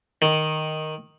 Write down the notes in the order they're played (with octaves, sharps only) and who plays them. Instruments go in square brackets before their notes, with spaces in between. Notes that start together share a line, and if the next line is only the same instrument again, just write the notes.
[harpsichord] D#3